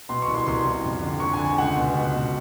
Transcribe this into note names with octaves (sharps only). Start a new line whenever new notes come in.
B2 C6
C#6
C2
C6
C2 C6
C2
F2
D3
D3 C#6
G#5
D3
G#5
C#2 F#5
B2
C#2
B2